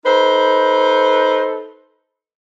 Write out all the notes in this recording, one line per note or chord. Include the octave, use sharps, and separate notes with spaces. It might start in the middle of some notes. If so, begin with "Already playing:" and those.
D#4 A4 B4 C5